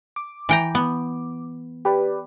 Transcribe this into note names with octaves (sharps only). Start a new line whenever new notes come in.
D6
E3 G5 A#5
B3
G4 B4 D5